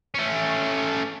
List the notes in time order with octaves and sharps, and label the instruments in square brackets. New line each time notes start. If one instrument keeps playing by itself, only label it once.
[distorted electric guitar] A3 C#4